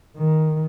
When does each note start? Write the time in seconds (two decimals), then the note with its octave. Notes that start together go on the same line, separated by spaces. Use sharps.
0.18 D#3